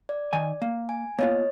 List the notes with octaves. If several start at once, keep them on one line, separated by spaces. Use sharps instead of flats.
D5
D#3 G#5
A#3
G#5
A#3 B3 F4 C#5 D#5